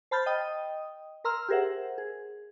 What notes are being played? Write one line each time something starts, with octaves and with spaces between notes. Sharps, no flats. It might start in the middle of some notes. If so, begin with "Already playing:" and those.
C5 A5 B5 F6 G6 A6
D#5 G5 D#6
A#4 A#5 C6 E6 F6
G4 G#4 A#4 C5 E5 F#5
G#4